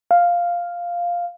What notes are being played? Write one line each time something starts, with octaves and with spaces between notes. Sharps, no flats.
F5